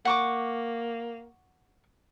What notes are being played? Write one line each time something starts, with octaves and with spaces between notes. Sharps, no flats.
A#3 F#5 C#6 D6